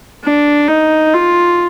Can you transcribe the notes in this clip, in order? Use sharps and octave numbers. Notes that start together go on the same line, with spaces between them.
D4
D#4
F4